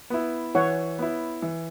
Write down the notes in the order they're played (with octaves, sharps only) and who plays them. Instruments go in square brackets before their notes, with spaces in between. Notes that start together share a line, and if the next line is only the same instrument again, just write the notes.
[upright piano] B3 E4
[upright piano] E3 [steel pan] C#5 F#5
[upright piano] B3 E4
E3